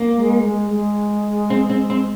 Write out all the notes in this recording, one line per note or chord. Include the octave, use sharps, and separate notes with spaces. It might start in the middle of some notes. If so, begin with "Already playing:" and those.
Already playing: A#3
G#3
G#3
G#3
C4
C4
C4